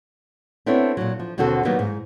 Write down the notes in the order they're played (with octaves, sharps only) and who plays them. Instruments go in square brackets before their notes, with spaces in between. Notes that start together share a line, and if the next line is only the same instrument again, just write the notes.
[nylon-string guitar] B3 C4 D4 E4 A4 C#5
A#2 F#3
F3
D#2 B2 D3 C4 F#4 A4
D#3 F#3 G3 A#3 B3 D#4
G#2